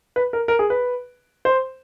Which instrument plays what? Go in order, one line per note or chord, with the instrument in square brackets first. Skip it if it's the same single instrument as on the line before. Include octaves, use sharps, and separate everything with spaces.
[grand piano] B4
A#4
A#4
G#4
B4
C5